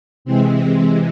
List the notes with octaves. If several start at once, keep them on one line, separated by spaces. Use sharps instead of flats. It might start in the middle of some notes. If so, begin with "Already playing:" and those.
C3 E3 G#3 C4